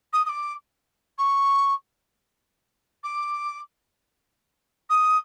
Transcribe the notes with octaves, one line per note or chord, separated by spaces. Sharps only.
D#6
D#6
D6
C#6
D6
D#6